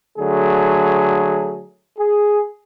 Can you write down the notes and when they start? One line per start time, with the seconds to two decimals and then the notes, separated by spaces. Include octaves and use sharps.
0.18 D3 F#3 A3 G#4
1.98 G#4